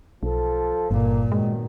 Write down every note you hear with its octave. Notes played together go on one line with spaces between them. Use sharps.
B1 F3 A4
G1 G2 A#2 A#3
F#2 B2 D#3 G#3